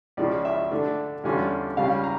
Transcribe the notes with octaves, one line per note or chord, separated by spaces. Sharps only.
C#2 C#3 F3 D5
E5
D3 A3 D4
E2 D3 G3 C#4 F4
C#2 C#3 G3 C#4 F5
A#5